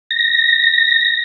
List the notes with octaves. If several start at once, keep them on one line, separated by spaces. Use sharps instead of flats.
A#6